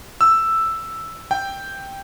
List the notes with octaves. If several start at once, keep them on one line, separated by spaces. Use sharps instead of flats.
E6
G5